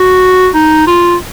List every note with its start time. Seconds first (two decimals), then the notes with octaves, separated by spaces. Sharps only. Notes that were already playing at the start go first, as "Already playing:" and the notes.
Already playing: F#4
0.55 D#4
0.87 F4